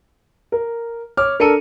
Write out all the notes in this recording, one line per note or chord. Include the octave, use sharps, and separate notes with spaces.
A#4
C#5 D6 F6
D4 A4 A#4 C#7 D#7